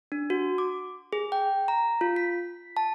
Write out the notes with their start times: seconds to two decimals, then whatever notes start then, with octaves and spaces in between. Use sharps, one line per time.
0.12 D4
0.30 F#4
0.58 D6
1.13 G#4
1.32 G5
1.68 A#5
2.01 F4
2.16 B6
2.77 A5